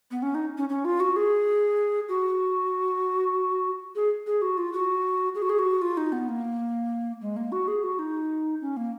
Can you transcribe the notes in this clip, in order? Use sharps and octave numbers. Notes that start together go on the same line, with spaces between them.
B3
C#4
D#4
C#4
C#4
F4
F#4
G#4
F#4
G#4
G#4
F#4
F4
F#4
G#4
F#4
G#4
F#4
F4
D#4
B3
A#3
G#3
A#3
F#4
G#4
F#4
D#4
C#4
A#3